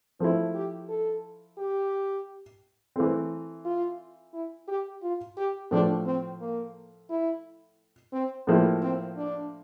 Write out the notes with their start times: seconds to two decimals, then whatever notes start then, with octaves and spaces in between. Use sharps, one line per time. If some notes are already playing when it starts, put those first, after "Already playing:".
0.20 F3 A3 C4 E4
0.54 G4
0.89 A4
1.58 G4
2.96 E3 A3 C4
3.65 F4
4.34 E4
4.68 G4
5.03 F4
5.37 G4
5.71 A2 F3 A3 D4
6.06 C4
6.40 A#3
7.10 E4
8.13 C4
8.47 A2 F3 A#3 E4
8.82 C4
9.16 D4